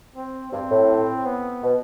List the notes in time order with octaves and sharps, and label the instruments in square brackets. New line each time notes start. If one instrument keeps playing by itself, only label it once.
[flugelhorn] C4
[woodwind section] G2 [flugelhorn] C4
[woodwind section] A2
[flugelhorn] B3
[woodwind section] B2